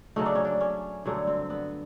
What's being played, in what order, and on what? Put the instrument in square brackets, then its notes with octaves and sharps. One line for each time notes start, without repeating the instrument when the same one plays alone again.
[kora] C#3 F#3 A3 D#4
D4
C#4
D4
C#4
G2 D3 F#3 A3 C#4
C4
B3